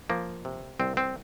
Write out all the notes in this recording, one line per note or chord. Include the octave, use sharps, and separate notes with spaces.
F3 A#3
C3
C2 C4
C4